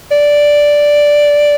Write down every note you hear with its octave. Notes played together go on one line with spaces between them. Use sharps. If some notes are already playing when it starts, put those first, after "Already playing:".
D5